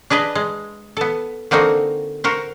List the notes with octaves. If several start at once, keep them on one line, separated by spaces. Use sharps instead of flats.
D4 G#4 B4 D#5
G#3
B3 A4
D3 A#3 C4 D#4 F#4
F#4 A#4 C5